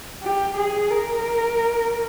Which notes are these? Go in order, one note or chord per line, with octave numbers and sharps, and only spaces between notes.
G4
G#4
A#4